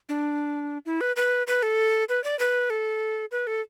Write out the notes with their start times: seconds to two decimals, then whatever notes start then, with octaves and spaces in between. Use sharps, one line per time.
0.09 D4
0.86 E4
1.01 B4
1.16 B4
1.47 B4
1.63 A4
2.09 B4
2.24 D5
2.39 B4
2.70 A4
3.32 B4
3.47 A4